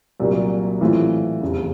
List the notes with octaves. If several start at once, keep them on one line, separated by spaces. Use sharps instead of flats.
C2 A#2 F#3 A#3
A2 E3 A3 C4 F4
F1 E2 C#3